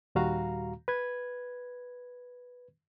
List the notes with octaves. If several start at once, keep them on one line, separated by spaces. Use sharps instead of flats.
D#2 A#2 G3 F#4 F5 A#5
B4 G#6